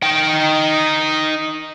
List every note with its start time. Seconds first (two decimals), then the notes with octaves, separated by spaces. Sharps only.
0.03 D#4 G5